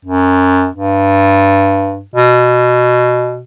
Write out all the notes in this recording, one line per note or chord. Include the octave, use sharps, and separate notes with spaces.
F#2
G2
B2